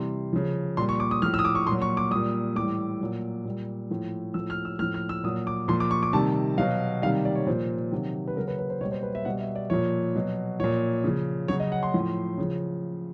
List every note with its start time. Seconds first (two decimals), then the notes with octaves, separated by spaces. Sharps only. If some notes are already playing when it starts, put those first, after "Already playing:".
Already playing: C3 E3 G3 C6
0.33 C#3 F3
0.77 A#2 G3 C6
0.89 C#6
1.00 D6
1.11 D#6
1.22 A2 F3 F6
1.34 E6
1.39 D#6
1.45 D6
1.55 C#6
1.67 A#2 F#3 C6
1.82 C#6
1.97 D6
2.11 A#2 G3 D#6
2.56 A2 E3 G3 D6
3.01 A#2 F#3
3.45 A#2 G3
3.91 A2 F3
4.34 F3 E6
4.40 A2
4.50 F6
4.65 E6
4.79 A2 F6
4.82 F3
4.94 F6
5.09 E6
5.24 A#2 F#3 D#6
5.47 D6
5.68 A#2 F3 C6
5.80 D6
5.91 C#6
6.03 D6
6.13 C3 D#3 G3 A5
6.57 B2 F#3 F5
7.02 C3 D#3 G3 F5
7.25 D5
7.35 C#5
7.47 A#2 F3 C5
7.91 C3 D#3 F#3
8.28 B4
8.36 C#3 F#3 A#4
8.48 B4
8.59 B4
8.70 C5
8.81 B2 G3 C#5
8.92 C5
9.03 B4
9.15 E5
9.25 B2 G3 F#5
9.41 E5
9.55 D5
9.70 A#2 F3 C#5
10.16 B2 F#3
10.60 A#2 F3 C#5
11.04 C#3 F3
11.48 C#3 F#3 C#5
11.60 D#5
11.72 F#5
11.83 C6
11.94 A2 F3
12.38 C#3 F3